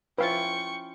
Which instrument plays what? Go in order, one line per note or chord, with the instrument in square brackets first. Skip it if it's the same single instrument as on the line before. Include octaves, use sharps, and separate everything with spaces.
[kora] F3 C#4 E4 [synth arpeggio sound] B4 F5 A6 [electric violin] G5 C#6